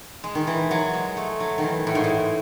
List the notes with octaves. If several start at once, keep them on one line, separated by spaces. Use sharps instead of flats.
G#3
D#3
E3
F#3
G#3
A3
F#3
D#3
E3
A2
G#2
A2